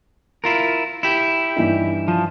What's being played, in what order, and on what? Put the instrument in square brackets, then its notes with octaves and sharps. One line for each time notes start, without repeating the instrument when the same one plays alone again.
[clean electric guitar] E4 F4 A#4
E4 G4
[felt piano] G2 E3 D#4
[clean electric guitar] F3